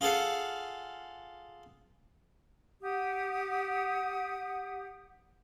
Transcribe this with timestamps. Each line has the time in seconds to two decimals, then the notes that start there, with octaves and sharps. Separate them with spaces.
0.01 F4 G#4 A4 F5 F#5
2.82 G4 F#5 D#6